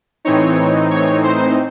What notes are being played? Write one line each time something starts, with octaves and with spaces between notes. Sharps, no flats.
A2 E3 C4 D#4 C#5
C#5
C5